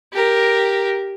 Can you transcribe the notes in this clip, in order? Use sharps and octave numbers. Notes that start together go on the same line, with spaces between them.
G4 A#4